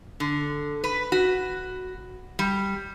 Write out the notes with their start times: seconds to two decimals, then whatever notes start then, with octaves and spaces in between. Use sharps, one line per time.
0.20 D3
0.84 B4
1.12 F#4
2.39 G3